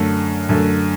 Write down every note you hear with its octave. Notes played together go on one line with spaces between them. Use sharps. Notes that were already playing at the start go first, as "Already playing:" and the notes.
Already playing: F#2 D3 A3
F#2 D3 A3